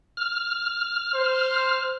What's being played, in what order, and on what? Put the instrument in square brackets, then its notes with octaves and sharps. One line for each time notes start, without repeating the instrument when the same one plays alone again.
[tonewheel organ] F6
[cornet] C5